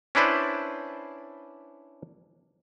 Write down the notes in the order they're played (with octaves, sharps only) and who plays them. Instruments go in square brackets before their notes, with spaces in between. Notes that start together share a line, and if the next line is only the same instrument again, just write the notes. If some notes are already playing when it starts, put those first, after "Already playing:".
[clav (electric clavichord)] C#4 D4 E4 B4 C5 D5